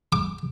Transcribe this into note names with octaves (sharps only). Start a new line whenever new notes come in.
D6